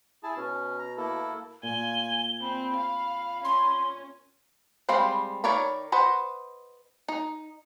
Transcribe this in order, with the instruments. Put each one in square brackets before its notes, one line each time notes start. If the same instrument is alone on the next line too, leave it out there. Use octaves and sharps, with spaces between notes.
[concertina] E4 G#4 A5
[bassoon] B2 [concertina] C#4
[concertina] A#5
A#3 E4 A4
[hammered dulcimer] A#2 [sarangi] G#5 [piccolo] G7
[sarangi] C4 [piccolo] B5
[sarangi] F5
[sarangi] C#4 [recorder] C6
[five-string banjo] G3 G#3 C4 F5 B5
D#3 A#4 C#5 D5 B5
B4 C5 D#5 F#5
D#4